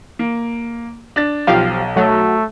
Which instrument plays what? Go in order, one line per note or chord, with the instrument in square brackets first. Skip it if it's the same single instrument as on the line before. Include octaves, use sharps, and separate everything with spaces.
[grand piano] A#3
D4 A6
[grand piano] B1 [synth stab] F3 G4 F5
[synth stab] F#3 [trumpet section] A3